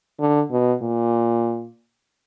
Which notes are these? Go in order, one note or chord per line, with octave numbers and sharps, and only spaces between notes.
D3
B2
A#2